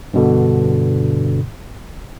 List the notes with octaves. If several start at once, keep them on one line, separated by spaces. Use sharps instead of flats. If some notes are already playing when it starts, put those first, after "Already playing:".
G2 B2 D3